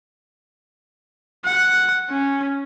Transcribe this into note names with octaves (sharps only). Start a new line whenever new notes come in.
F#5
C#4